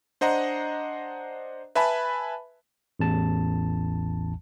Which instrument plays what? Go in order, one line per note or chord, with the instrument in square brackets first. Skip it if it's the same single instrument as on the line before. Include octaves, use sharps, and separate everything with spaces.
[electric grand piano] D4 C5 D#5 F#5 A#5
B4 E5 G#5 A5 B5
[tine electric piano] A1 E2 A5